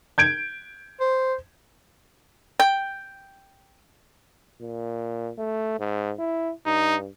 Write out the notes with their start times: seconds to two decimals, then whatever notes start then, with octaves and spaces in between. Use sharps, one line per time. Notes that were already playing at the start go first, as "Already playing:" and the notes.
0.18 G6 G#6 D7
1.00 C5
2.60 G5
4.60 A#2
5.38 A3
5.79 G#2
6.19 E4
6.66 G2 D#4